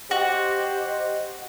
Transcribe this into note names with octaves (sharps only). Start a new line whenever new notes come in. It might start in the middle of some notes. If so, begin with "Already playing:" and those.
F#4 G4 C5 D#5